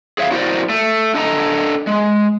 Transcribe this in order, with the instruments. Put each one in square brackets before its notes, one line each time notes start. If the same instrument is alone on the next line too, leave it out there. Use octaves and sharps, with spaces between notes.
[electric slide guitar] G#4 C#5 E5 F5
E4 F#4 A#4 C5 D5
A3
D4 A4 D#5 A5 A#5
G#3